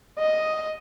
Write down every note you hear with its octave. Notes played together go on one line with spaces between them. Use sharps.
D#5